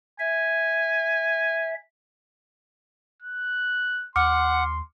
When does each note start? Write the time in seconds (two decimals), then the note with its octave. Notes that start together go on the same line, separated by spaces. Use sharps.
0.20 E5 G#5
3.22 F#6
4.16 D#2 F#5 C6 D6 F6 C#7